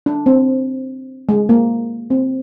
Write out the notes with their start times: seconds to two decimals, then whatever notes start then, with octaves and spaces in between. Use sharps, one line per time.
0.06 D4
0.26 C4
1.29 G#3
1.49 A#3
2.10 C4